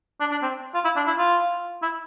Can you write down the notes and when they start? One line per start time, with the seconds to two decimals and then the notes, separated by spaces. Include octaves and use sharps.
0.20 D4
0.31 D4
0.42 C4
0.75 F4
0.85 E4
0.96 D4
1.07 E4
1.18 F4
1.82 E4